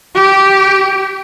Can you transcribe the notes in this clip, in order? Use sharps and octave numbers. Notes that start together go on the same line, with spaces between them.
G4